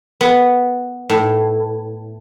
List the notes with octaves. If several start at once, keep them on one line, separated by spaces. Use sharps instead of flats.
B3
A2